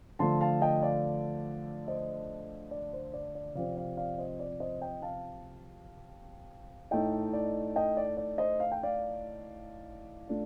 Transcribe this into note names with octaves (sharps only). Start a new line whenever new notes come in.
D3 F3 A3 A5 C6
F5 A5
D#5 G5
D5 F5
C5 D#5
D5
C5
D5
D5
C3 F3 C4 D5 F5
D5 F5
D5 F5
C5 D#5
D5
C5 D#5
D#5 G5
F5 A5
A2 A3 D#4 D#5 G5
D5
D#5 G5
D5
D5
C5 D#5
F5
G5
D5 F5
A3 D4 F4